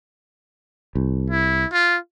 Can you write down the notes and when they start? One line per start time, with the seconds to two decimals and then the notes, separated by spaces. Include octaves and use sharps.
0.95 C2
1.30 E4
1.72 F4